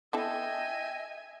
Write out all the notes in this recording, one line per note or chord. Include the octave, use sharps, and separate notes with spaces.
B3 E4 A4 D#5 E5 G5 G#5